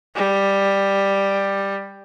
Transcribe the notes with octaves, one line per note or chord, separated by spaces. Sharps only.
G3